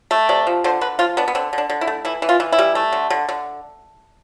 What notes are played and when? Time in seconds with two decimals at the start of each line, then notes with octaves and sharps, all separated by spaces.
0.11 A3
0.29 C3 D5
0.47 F3
0.64 D3 C5
0.81 D3 B4
0.99 F3 F4
1.17 B3 D4
1.28 B3
1.35 D3 C4
1.53 D3
1.58 D4
1.70 D3
1.81 E4
1.87 A3
2.05 E3 E4
2.22 E3
2.29 F4
2.40 E3
2.52 E4
2.58 G3
2.75 A3
2.92 D3
3.10 D3
3.29 D3